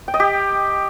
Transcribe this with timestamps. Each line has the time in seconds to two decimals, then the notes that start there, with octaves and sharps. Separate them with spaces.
0.08 G5
0.14 D#5
0.20 G4